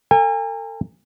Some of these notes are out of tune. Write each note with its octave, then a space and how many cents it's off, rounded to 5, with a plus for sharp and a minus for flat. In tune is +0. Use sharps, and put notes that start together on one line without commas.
A4 +40 G#5 -40